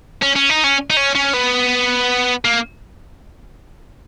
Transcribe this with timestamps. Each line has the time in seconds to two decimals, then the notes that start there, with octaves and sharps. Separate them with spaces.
0.23 C#4
0.36 C#4
0.50 D#4
0.64 C#4
0.90 D#4
0.97 C#4
1.15 C#4
1.34 B3
2.45 A#3